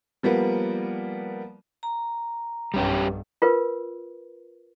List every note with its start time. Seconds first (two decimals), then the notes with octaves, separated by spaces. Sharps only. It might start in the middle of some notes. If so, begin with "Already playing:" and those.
0.23 F3 G3 A#3 B3
1.83 A#5
2.74 B1 G2 G3 C#4 G4
3.42 F4 A#4 B4